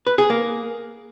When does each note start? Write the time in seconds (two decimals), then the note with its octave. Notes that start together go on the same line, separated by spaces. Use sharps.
0.07 B4
0.18 G#4
0.30 A#3